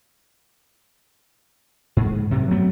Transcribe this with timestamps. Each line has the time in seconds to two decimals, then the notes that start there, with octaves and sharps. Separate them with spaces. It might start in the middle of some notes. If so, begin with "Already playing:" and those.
1.97 G#2
2.31 F#2 C3
2.51 F#3 A3 B3 C4